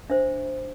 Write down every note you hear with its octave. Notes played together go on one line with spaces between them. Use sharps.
D4 C5 E5